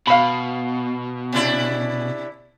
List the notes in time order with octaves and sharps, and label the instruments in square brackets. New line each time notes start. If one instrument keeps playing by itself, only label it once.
[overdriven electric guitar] B2 [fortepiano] F5 B5
[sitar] C3 D4 E4